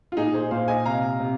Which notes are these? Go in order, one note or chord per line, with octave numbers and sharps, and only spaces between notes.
F4
A#2 D#4 G#4
G#4 C5
A#2 C5 F5
D#5 G#5
C3 F5 A#5
C3